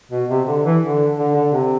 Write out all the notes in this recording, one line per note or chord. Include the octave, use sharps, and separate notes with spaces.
B2
C3
D3
E3
D3
D3
D3
C3